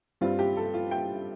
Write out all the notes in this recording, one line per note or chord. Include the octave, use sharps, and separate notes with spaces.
G2 G3 C4 F4
G4
A4
F4
G5